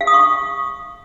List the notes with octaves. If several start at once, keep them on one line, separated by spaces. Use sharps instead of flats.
F5
D#6
C#6